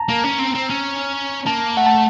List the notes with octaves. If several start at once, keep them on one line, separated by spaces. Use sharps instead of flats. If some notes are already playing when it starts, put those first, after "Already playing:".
Already playing: A5 A#5
A#3
C#4
C4
C4
C#4
A#3 A5
A3 F#5
A5